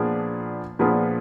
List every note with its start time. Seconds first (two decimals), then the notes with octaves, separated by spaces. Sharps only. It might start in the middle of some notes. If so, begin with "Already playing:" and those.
Already playing: A#2 F3 B3 D4 G#4
0.79 A#2 F3 B3 D4 G#4